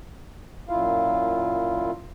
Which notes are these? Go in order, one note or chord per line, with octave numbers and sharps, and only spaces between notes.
F#2 A#2 E4 F4 F5